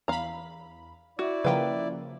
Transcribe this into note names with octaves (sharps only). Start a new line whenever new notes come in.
E2 F5 A#5 B5
E4 F#4 D5
C#3 F3 A#3 B4 G5